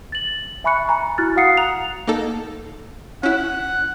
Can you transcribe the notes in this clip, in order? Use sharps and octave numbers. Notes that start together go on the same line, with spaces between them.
A6 F#7
E5 G#5 B5 C#6 F#6 C#7
G#5 A#5 B5
E4 F#4 F6 F#6 A6
F#4 F5 F#5 D#6 C7 C#7
A#5 F#6 F7
A#3 D#4 A4
C#4 E4 F#5